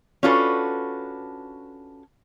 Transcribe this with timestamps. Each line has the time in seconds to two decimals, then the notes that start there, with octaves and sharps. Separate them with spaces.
0.23 C#4 D4 F4 F#4 A4 B4